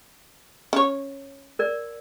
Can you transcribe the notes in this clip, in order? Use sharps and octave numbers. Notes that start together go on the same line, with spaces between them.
C#4 C#5
A#4 D5